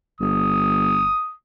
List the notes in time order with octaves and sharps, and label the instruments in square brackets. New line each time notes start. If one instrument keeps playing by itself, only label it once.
[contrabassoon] G1 [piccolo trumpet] D#6